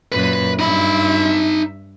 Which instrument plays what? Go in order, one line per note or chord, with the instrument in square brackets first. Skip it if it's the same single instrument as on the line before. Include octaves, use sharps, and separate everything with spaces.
[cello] F#2 A#2 [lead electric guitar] B4
[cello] G2 E5 [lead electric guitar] D#4 B5